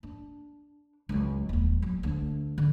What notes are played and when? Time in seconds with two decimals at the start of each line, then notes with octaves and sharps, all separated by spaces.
0.03 D4
1.09 C#2 F#3
1.49 D#1 F3
1.82 F#3
2.03 D2 D4
2.58 D3